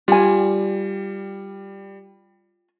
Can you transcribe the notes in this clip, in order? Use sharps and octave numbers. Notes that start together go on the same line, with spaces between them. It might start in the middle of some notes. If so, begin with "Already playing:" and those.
G3 F4 G#5